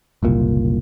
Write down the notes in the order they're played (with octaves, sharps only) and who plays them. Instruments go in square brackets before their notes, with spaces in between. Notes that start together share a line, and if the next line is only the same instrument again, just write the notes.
[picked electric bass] F#1 C2 A#2